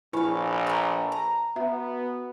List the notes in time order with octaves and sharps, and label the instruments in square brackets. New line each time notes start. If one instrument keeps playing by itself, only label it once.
[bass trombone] A#1 [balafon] E4 [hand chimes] B4 G#5 B5 [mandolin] C#5 F5
[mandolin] A3 A#5
A#5
[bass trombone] B3 [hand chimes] F#4 [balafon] E5